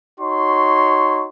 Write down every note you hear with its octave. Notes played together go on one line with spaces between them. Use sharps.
D#4 F#4 C#5 C6